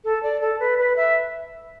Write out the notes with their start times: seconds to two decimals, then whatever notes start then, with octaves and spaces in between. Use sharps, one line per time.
0.04 A4
0.23 D5
0.41 A4
0.60 B4
0.78 B4
0.96 E5